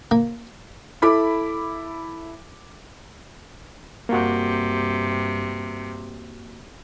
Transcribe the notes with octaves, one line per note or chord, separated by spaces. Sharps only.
A#3
E4 A4 B5 D6
G2 C3 A#3 F#4